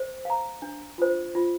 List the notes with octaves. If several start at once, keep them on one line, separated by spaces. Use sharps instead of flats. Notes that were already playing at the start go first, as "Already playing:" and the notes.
Already playing: C5
F5 A#5
D4
F4 C5
F4